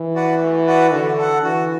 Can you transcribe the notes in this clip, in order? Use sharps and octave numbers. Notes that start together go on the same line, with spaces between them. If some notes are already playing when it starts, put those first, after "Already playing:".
Already playing: E3
F#4 B4 D5 F#5
A3
F#4 B4 D5 F#5
D3 F#4
A4 F#5
E3 F#4